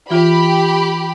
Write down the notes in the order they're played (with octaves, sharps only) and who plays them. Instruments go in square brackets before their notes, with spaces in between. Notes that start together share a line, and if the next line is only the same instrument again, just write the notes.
[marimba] E3 F4 [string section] G4 B5